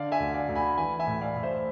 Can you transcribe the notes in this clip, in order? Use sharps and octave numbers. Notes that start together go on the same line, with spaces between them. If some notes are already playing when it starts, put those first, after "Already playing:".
Already playing: D3 D5 F5
E5 G#5
D2
D5 F5
D2
G#5 B5
E3 G#5 B5
E5 G#5
A2
D5 F5
A2
C5 E5